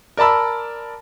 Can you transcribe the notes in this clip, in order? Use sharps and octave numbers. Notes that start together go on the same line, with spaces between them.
A#4 D5 A5 B5 E6